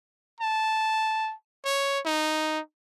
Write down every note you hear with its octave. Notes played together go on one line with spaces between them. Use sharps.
A5
C#5
D#4